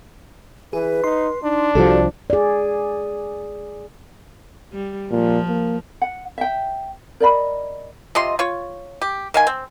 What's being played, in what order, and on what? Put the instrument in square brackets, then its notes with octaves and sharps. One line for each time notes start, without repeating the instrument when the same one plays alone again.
[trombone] E3 [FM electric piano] G#4 [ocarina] B4
[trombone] D#4 [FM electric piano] C6
[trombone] D4 [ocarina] D#4
[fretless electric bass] C2 F3 [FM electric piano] F#4 G4 A4 [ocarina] D5
[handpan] G#4 D5
[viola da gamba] G3
[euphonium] A#2 [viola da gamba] F3
[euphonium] A#3
[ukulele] F#5
E5 G5
A#4 D5 D#5 B5
[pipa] C3 F4 D#5 C6
F4 C#5
G4
D#3 F5 G#5
C4